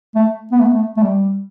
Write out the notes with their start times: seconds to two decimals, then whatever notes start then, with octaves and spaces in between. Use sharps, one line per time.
0.15 A3
0.52 B3
0.59 A3
0.65 B3
0.73 A3
0.97 A3
1.03 G3